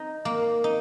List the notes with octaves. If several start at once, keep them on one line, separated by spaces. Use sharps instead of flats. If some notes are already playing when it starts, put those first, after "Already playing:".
Already playing: D#4
A#3
D#4